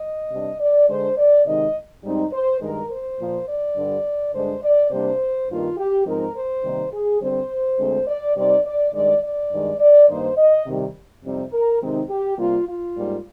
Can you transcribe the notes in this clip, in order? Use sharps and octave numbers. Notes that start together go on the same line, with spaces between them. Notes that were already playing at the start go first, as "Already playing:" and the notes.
Already playing: D#5
C3 G3 D4
D5
D3 G#3 D4 C5
D5
C3 D#3 G#3 D#4 D#5
G#2 G3 C4 D#4
C5
G2 D#3 G#3 A#4
C5
A#2 F3 A#3
D5
G2 D3 G3
G2 D3 G#3 D4 C5
D5
C3 G3 A#3 D4 C5
G2 D#3 A#3 F4
G4
G#2 F3 C4 D#4 A#4
C5
C3 D#3 G3 A#3 D#4
G#4
D3 G3 C4 C5
D2 D3 G#3 C4
D5
C3 G3 C4 D#4 D5
D5
G2 D#3 G#3 D5
D5
G2 D#3 G#3
D5
G2 D#3 A#3 D#4 C5
D#5
C3 D#3 G3
F2 C3 G3 C4 D#4
A#4
C3 D#3 G#3 C4 D#4
G4
C3 G3 A#3 F4
F4
G#2 G3 A#3